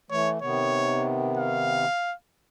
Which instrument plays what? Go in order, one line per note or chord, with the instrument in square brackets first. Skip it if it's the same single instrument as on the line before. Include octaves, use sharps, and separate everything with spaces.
[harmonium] E3 A3 [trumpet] C#5
[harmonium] C3 D#3 B3 [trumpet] C#5
[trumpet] F5